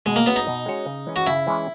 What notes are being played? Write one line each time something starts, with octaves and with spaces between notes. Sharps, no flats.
B2 G#3
A#3
G#3 B3 C#4 F#4 C#5
D#4
B2
G#3 C#4 F#4 C#5
C#3
E3 G#3 C#4
F#4
C#3 E4
E3 G#3 C#4